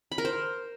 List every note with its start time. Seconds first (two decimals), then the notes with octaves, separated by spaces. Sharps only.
0.12 B5
0.18 A#4
0.25 C5